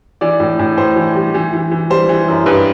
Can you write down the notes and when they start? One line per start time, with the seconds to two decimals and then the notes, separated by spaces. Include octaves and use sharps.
0.21 E3 D5
0.40 A2
0.59 A2
0.77 A2 C5
0.96 E3
1.15 G3
1.34 E3
1.53 E3
1.71 E3
1.90 G3 C5
2.09 E3
2.28 F#2
2.46 G2 B4